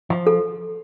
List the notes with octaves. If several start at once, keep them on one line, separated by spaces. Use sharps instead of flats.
F3
A4